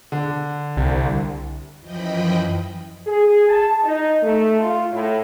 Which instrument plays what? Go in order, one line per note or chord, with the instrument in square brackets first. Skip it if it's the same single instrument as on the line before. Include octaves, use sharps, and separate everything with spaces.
[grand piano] D3
[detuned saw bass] C2
[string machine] F#2 E3 F3 D#5 G5 B5
[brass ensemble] G#4
A5
D#4
A3
F4
A2